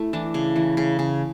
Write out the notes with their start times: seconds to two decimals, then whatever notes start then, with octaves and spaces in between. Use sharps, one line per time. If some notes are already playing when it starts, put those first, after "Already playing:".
Already playing: A3 E4
0.13 E3 D4
0.34 C#3
0.56 E3
0.77 C#3
0.99 C#3